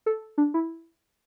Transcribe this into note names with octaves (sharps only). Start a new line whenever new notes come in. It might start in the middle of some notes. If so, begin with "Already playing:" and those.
A4
D4
E4